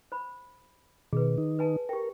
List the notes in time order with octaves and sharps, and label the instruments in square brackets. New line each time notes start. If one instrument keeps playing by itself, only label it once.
[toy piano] C5 B5
[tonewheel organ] B2 D#3 [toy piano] G#4 B4
[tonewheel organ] D#3 D#4
[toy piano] B4 G#5 A5
[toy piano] G4 G5 [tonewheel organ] A#4